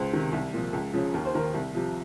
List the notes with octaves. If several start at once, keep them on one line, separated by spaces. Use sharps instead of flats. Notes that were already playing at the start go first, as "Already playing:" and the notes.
Already playing: C#2 C5
C3 D#3
C2
A#2 F3
C#2
C#3 F3
D#2 A#4
C5
D#3 A#4
C2
C3 F3